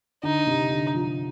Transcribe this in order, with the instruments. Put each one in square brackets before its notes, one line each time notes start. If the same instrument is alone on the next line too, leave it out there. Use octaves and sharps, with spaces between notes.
[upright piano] D3 [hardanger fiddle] D#4
[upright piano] C3
D3
F3